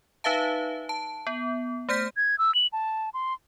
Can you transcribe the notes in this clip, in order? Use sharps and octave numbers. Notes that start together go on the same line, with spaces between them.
D#4 B4 E5 F5 A5
A5
B3
A3 C5 F6 G6 B6
G#6
E6
F#7
A5
C6